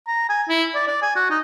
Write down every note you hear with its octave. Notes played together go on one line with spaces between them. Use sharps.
A#5
G#5
E4
D5
D5
G#5
F#4
D#4